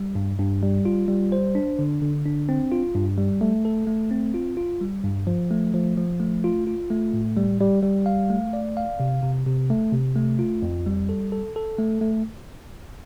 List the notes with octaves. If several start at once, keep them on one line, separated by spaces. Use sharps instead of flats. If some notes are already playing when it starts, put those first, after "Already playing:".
Already playing: G3
G2
G2
G3
F4
G3
C5
D4
D3
D3
D4
C4
F4
G2
G3
A3
A4
A3
C4
F4
F4
G3
G2
F3
A3
F3
F3
A3
F4
F4
A3
A2
G3
G3
G3
F5
A3
D5
F5
C3
C3
C3
A3
C3
A3
F4
F2
G3
A4
A4
A4
A3
A3